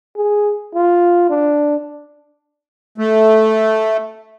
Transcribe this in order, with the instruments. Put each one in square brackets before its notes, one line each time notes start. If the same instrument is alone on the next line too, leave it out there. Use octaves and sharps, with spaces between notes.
[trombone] G#4
F4
D4
[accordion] A3